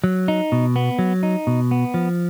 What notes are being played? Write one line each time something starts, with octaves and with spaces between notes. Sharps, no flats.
F#3
D#4
B2
B3
F#3
D#4
B2
B3
F3